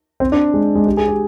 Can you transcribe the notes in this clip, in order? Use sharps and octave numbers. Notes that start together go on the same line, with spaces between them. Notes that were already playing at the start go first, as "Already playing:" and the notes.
C4
D4
G#3
G#3
G4
G#4
G4